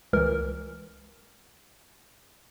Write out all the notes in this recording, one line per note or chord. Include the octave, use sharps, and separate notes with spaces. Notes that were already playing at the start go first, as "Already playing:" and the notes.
C#2 E3 A#4